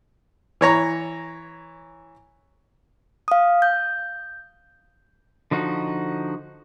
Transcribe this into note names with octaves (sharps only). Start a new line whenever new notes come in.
E3 C#5 A#5
F5 D#6
G6
D3 F3 D#4 F#4